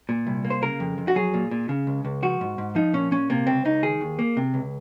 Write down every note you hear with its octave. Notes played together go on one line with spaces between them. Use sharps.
A#2
C2
A#3
C5
C#3 A#4
F2
F2
F#4
F#3 G#4
A#2
A#2
C#3
C#2
C#2
F3 F#4
G#2
G#2
F3 D#4
A#2 C#4
A#2 C#4
C3 A#3
C#2 C4
C#2 D#4
D#3 G#4
D#2
A#3
C3
C#2